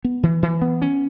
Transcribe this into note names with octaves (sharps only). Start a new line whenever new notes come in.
B3
E3
E3
B3
C#4